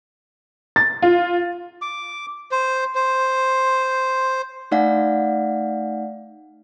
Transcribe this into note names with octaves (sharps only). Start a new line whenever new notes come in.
A6
F4
D6
C5
C5
A3 D#4 D5 F5 F#5